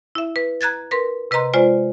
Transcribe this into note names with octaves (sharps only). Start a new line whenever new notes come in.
E4 E5
B4
A#5 F#6 G#6 A6
A#4 B4 C6
C3 B4 D#5 A#5 C6
G#3 F4 C5 D5